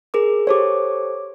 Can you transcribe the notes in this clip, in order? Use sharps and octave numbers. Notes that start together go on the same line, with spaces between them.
G#4 A#4 D6
G4 A4 C5 C#5 D6